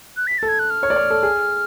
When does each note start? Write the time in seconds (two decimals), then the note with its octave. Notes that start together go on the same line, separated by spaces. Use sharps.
0.17 F#6
0.27 B6
0.38 A4 A6
0.48 G#6
0.59 F#6
0.70 F6
0.83 C#5
0.90 D5
0.96 C#5
1.10 A4
1.23 G#4